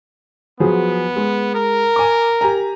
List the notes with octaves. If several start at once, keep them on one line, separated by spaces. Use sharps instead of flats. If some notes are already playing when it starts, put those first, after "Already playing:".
F3 F#3 B3 G#4
G#3
A#4
G#5 D6
G4 G#5 A#5